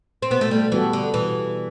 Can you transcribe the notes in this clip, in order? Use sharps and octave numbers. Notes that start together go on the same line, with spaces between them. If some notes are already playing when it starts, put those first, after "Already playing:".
C4
B2 B3
A3
G3
E3 G3 B3 F#4 A4
D3
B2 E3